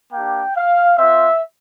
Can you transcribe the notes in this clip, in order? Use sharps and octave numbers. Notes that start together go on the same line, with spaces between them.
A#3 D4 G4 G5
F5
C4 F4 E5